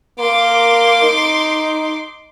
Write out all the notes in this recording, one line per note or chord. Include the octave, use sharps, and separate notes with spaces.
A#3 C6 D6
D#4